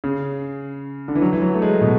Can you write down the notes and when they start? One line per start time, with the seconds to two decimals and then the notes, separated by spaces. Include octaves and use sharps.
0.04 C#3
1.08 D3
1.15 E3
1.22 F#3
1.33 E3
1.42 F#3
1.54 A3
1.62 G#3
1.81 B2